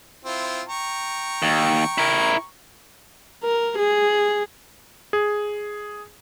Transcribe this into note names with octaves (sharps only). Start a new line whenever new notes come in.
C4 E4 F4
G5 A#5 C#6
D#2
E4 A#4
A#4
G#4
G#4